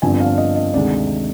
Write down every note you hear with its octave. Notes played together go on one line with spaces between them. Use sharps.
G1 G2 D3 F3 C4 G#5
F5
D#5
D#5
D2 C3 D#3 G#3 D5